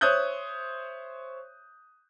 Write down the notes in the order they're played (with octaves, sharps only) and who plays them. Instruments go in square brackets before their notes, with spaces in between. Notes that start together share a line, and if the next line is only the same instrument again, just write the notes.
[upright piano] C5 C#5 E5 D#6 F#6 G6